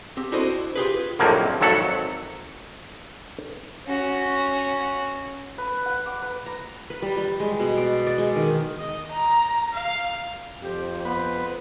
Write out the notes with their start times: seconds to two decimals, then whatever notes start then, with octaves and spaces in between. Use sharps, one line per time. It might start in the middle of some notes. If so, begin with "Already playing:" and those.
0.17 C4 G4
0.32 D4 E4 F#4 A4 C5 D#5
0.76 F4 G4 G#4 B4
1.19 A#1 F2 A2 F3 F#3 A#3
1.61 G#1 F2 F#3 A4 E5 F#5
3.86 C#4 F#4
5.58 B4
5.86 F#5
6.06 D6
6.22 B4
6.46 A#5
6.90 B4
7.02 G3
7.17 G3
7.40 G#3
7.59 B2
7.77 D5
8.07 D5
8.18 G#3
8.36 D#3
8.79 D#5
9.12 A#5
9.73 F5
10.62 F2 G4 C5
11.05 B3 B4 C5